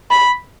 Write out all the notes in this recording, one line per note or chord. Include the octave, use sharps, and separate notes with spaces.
B5